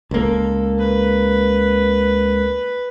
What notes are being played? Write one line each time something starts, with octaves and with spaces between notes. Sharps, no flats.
C#2 A#3 A4
B4